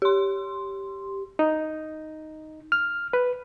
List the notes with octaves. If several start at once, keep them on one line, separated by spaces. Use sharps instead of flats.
G4 C6
D#4
F6
B4